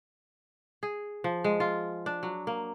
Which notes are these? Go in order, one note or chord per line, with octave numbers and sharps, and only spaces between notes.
G#4
F3
G#3
F4
D4
F#3
A#3